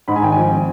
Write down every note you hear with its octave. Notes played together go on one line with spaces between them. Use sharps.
G#2 B5
G#5
G#1 G5
G#5
F3
C4